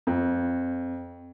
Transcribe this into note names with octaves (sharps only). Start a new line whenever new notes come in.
F2